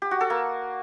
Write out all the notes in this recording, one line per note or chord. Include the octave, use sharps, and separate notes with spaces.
G4
F#4
A4
A#3